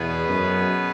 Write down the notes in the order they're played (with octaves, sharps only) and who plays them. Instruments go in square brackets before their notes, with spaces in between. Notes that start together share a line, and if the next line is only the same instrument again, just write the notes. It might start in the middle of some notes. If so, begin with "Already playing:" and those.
Already playing: [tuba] E2 [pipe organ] B2 B3 G#4 B4
[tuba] F#2